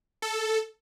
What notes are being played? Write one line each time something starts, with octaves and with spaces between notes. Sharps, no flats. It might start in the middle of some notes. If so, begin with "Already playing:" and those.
A4